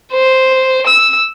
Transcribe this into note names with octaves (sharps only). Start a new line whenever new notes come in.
C5
E6